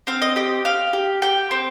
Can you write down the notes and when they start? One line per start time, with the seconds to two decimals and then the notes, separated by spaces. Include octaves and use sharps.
0.07 C4 F5
0.22 D#5
0.36 G4 D#5
0.65 G4 F5
0.93 G4
1.22 G4 G5
1.51 C4